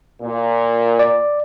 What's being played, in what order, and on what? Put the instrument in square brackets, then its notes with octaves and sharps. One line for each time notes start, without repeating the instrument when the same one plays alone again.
[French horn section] A#2
[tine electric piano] D5